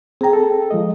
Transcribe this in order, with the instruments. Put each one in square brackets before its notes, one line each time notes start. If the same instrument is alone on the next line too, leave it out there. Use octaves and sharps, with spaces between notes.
[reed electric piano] C4 A#5 [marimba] G#4 G5
[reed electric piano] A4
F3 G#3 D#5